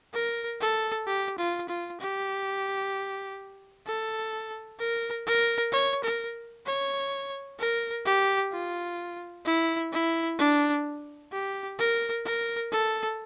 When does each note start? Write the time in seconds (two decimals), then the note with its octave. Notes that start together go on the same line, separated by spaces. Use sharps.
0.14 A#4
0.60 A4
1.07 G4
1.38 F4
1.69 F4
2.00 G4
3.87 A4
4.79 A#4
5.27 A#4
5.72 C#5
6.04 A#4
6.66 C#5
7.59 A#4
8.06 G4
8.52 F4
9.46 E4
9.92 E4
10.38 D4
11.32 G4
11.79 A#4
12.25 A#4
12.72 A4